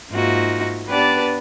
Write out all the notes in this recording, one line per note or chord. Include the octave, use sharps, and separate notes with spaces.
G#2 A#3 D#4 F4 F#4 E5
B3 D4 G4 B4 D5 A5